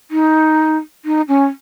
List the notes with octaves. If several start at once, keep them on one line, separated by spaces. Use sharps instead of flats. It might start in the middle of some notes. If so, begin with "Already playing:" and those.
D#4
D#4
C#4